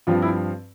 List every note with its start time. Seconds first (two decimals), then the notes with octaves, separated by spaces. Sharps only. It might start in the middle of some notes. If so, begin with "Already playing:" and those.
0.07 G2 F3 C4 F4
0.22 E4